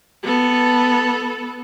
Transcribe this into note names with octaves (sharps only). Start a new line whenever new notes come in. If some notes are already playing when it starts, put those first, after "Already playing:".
B3 A4